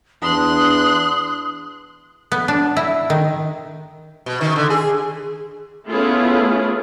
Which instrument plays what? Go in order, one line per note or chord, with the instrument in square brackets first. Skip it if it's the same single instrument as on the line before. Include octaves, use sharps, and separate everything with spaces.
[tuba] E2 [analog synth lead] D4 [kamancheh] C6 F#6 [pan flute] D#6
[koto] B3
D4
E4
D#3
[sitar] B2
D#3
D3
G#4
[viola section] A3 B3 C#4 E4 F4 G#4